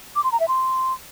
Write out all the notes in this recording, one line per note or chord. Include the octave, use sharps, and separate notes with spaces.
D6
C6
A#5
E5
C6